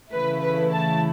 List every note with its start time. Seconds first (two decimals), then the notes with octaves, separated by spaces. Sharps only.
0.12 C#3 E3 A3 E4 B4
0.42 B4
0.73 A5